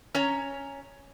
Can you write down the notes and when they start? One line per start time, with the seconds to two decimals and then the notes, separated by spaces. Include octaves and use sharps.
0.14 C#4 C#5 A#5